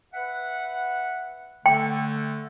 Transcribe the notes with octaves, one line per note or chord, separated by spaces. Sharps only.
B4 E5 F#5
D3 A3 G5